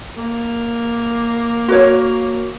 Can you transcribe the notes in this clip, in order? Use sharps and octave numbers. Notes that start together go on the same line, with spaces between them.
A#3
F#4 A#4 C#5